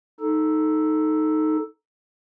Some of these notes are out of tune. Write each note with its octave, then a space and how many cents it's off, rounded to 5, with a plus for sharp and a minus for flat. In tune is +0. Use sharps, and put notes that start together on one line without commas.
D#4 +0 A4 +0